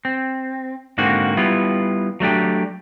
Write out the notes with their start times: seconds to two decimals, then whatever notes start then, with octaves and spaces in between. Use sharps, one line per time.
0.05 C4
0.98 G#2 D3 A#3 C4 F#4
1.37 G3 B3 E4 F4
2.20 F#3 A3 D4 G4